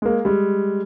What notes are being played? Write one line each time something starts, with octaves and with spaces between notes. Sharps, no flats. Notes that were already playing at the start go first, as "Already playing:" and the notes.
G#3 A#3
G3 G#3